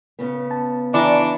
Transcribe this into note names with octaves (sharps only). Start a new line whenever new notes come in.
C#3 B3
A5
E3 D4 D5 A#5 C#6 D6